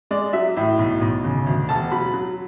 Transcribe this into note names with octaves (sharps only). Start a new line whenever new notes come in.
G#3 D5
F#3 E5
A2 E5
B1
B1
C#3
D2
E1 A5
F#3 B5
F#3